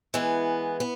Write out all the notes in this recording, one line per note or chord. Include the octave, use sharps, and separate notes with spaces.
E3 G#3 B3
B3